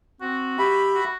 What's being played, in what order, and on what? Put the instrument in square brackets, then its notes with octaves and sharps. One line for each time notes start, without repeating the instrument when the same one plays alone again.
[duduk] C4 [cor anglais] F#4
[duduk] G4 [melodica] E5 B5
[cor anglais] F#4